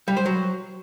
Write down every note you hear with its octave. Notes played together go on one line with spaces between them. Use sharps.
G3
C5
F#3